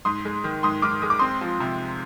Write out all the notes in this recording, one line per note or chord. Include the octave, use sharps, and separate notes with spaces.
G#2 C6 D#6
G#3
D#3
G#2 C6 D#6
G#2 D6 F6
G#3 D#6
D6
C4 C6 D#6
F3
C3